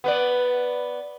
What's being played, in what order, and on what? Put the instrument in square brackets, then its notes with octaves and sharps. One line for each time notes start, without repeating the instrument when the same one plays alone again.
[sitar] B3 B4 D5